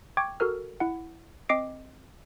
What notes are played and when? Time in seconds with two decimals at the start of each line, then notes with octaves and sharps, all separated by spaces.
0.17 G5 C#6 D6 G#6
0.40 F#4 A4 A#4 F6
0.80 E4 F#5
1.49 C4 D#5 D6 C7 D7